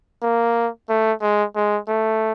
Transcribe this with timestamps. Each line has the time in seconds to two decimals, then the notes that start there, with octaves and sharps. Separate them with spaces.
0.23 A#3
0.89 A3
1.22 G#3
1.56 G#3
1.88 A3